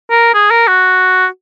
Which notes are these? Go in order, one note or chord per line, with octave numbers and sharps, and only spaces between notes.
A#4
G#4
A#4
F#4